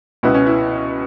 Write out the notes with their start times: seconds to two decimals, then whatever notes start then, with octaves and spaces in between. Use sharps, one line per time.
0.23 C#2 B2 B3 E4
0.34 C#4
0.47 E4